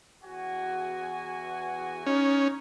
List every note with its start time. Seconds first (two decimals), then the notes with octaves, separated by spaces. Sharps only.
0.23 E2 F#4 G#5
2.06 C#4 D#4